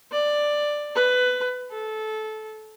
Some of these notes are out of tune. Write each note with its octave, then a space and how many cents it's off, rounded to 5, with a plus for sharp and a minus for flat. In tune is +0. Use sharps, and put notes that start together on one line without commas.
D5 +10
B4 +15
A4 -20